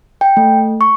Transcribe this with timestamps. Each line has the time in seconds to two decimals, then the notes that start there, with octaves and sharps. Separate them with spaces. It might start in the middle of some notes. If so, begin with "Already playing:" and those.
0.21 G5
0.37 A3
0.81 C#6